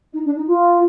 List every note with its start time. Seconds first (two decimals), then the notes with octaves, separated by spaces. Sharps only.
0.13 D#4
0.25 D4
0.36 D#4
0.47 F4